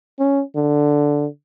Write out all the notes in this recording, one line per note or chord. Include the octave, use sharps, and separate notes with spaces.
C#4
D3